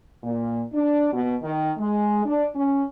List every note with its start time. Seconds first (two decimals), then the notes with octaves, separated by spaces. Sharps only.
0.24 A#2
0.74 D4
1.12 B2
1.42 D#3
1.78 G#3
2.25 D4
2.55 C#4